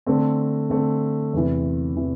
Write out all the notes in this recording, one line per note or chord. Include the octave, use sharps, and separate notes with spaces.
D3 A3 C4
D3 A3 C4
E2 C3 E3
C3 E3